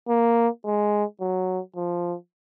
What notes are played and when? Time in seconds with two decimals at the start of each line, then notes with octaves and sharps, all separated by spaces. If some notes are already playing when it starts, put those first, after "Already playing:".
0.09 A#3
0.65 G#3
1.21 F#3
1.76 F3